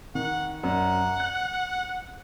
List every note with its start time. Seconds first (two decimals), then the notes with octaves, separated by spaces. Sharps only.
0.15 D#3 F#5
0.63 F#2 D5 F#5
1.20 F#6